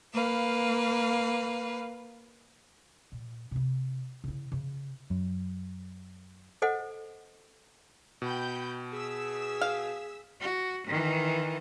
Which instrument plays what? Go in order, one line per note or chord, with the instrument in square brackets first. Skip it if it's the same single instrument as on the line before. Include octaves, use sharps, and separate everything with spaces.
[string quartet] A#3 B4 F5
[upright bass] A#2
C3 E4
C#3 E4
C#3
[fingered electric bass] F#2
[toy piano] A4 C5 D#5 F#5
[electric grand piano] B2 [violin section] G5 B5 G6
[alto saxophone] G#4 [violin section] E6 B6
[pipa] F5
[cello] F#4
D#3 E3